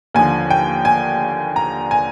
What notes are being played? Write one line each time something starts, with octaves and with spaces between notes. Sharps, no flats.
D#2 D3 F3 G#5
G5
G#5
A#5
G#5